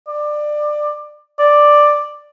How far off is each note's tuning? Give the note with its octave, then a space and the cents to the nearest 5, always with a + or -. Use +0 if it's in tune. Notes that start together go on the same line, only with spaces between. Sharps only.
D5 +20
D5 +5